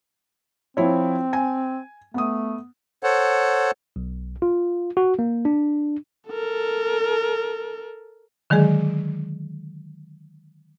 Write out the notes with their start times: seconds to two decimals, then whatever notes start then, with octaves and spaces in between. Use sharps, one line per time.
0.77 F3 C4 E4 C#5
1.33 G#5
2.14 A3 B3 D#6
3.03 A4 C5 C#5 F#5
3.96 B1
4.42 F4
4.97 F#4
5.19 A#3
5.45 D4
6.28 A4 A#4
8.50 D3 D#3 F#3 G#3 G#4